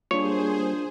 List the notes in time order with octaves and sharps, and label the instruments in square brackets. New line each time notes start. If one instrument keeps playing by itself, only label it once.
[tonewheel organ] G3 A#3 [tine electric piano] D4 F4 [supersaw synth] G#4 C5 [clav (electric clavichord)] C#5